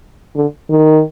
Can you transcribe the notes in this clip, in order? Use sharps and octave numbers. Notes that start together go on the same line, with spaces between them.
D3
D#3